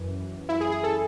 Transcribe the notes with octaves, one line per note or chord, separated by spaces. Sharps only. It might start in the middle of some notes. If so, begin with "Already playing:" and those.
Already playing: F#2 E3
E4
G#4
G#4
A4